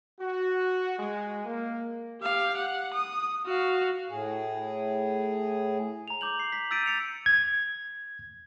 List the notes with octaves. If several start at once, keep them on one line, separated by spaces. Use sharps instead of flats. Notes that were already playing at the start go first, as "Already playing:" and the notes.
F#4
G#3
A#3
G4 F5
F#5
D#6
F#4 F5
A2 G#4
A#5 F7
D6 G6 F#7
C7
B6
E6 G6 A6 B6 D7 D#7
A6 C#7 F7
G#6